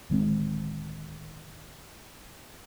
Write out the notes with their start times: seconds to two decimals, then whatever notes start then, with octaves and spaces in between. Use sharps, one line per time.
0.10 D1 D#3 G#3 C4